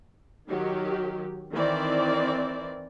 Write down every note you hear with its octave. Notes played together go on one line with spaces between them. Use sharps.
D#3 F#3 G4
D#3 E3 C4 D5